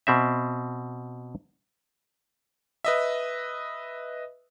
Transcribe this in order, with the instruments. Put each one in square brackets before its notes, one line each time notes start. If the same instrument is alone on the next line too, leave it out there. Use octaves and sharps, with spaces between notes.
[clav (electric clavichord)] B2 C4 E5
[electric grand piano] B4 D#5 E5